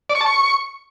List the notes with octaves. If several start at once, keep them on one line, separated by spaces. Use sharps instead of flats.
D5
C#6
A5
C#6